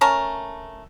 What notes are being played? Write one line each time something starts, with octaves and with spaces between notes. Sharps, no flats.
A3 C#4 A#4 A5